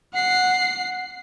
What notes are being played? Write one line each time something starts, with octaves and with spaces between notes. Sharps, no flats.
F#5 C7